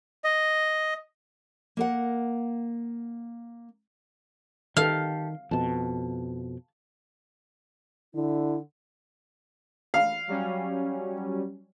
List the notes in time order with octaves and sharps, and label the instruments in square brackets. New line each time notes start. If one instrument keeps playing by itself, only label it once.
[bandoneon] D#5
[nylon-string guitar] A#3 A#4 F#5
[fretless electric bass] D#3 [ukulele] G4 A4 [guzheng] F5
[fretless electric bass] F2 B2 [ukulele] A5
[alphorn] D3 [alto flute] E4
[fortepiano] F5
[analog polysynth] F#3 G3 C#4